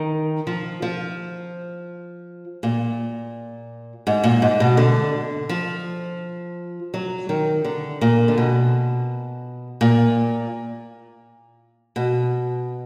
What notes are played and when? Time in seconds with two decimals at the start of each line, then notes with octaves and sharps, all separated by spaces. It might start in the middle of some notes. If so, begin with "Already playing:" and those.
Already playing: D#3
0.47 F3
0.82 F3
2.63 A#2
4.07 G#2
4.24 A#2
4.42 G#2
4.60 B2
4.77 D3
5.49 F3
6.94 F#3
7.29 D#3
7.65 D3
8.01 A#2
8.28 D3
8.38 B2
9.81 A#2
11.96 B2